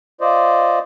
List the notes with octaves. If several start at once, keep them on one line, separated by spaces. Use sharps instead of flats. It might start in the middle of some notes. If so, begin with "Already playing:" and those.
F4 C5 D5 D#5